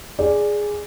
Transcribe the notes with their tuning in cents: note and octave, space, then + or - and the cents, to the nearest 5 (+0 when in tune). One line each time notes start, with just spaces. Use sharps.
G#4 +0 D5 +0